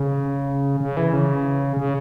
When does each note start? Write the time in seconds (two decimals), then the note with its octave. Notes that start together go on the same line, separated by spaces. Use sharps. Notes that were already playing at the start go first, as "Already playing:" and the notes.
Already playing: C#3
0.80 C#3
0.97 E3
1.13 C#3
1.77 C#3